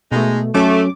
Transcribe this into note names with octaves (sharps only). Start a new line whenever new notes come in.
B2 G#3 A3 D#4
F#3 A3 C#4 D6